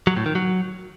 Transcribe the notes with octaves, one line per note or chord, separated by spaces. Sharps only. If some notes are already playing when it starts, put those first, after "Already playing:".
F#3
A2
D#3
F#3